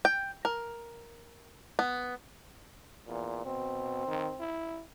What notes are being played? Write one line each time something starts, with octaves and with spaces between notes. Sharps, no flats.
G5
A#4
B3
E2 A#2
B2 C4
D#3
E4